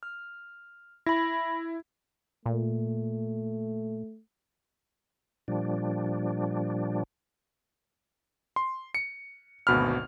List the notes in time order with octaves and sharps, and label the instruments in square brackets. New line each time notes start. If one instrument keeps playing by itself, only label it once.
[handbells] F6
[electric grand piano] E4 [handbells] B5 A#6
[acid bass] A#2 [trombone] A3
[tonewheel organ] A#2 F3 G3 D4
[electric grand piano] C6
C#7
G#1 D2 B2 B5 F6